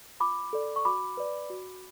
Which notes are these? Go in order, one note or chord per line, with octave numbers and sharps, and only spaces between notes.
F4 B5 D6
A4 D5
C#6
F#4 B5 D6
B4 D5
F#4